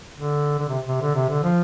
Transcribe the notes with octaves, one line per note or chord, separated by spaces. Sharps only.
D3
D3
C3
C3
D3
C3
D3
F3